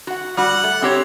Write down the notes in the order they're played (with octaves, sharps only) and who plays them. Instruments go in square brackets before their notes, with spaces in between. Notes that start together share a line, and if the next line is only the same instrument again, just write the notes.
[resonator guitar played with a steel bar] F#4 F#5
[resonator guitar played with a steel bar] G3 F#4 [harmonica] F#5
[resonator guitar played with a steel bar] A3
C4 G4 C#5